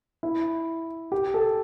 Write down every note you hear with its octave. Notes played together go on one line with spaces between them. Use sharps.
E4
G4
A4